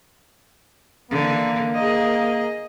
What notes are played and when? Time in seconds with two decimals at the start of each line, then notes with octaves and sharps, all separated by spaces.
1.11 D3 E3 A#3
1.75 G#4 D#5